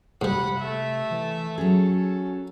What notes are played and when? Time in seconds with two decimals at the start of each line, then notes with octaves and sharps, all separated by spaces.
0.22 G#2 C3 G3 F#5 B5
0.58 A3 E5
1.11 E3
1.58 F#3 C#4 G#4 A4